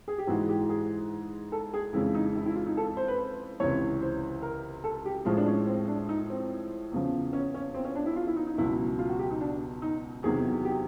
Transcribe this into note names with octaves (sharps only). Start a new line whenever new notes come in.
G#4
G4
G#2 E3 G#3 F#4
G4
G#4
A4
G#4
F2 C#3 E3 G#3 E4
D#4
E4
E4
F4
D#4
A4
C5
B4
C5
C#2 C3 E3 C#5
C5
A#4
A4
G4
A2 F3 G#3 F4
D4
C#4
C4
D4
D#4
C4
E2 C#3 F3
C#4
C#4
C4
C#4
D4
E4
F4
E4
D#4
D#4
C#2 B2 F#3 E4
F4
F#4
G4
D#4
D4
D#4
E2 C3 D#3 F#3 G#4
G4